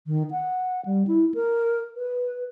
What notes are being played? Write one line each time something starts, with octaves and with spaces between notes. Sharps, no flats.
D#3
F#5
G3
E4
A#4
B4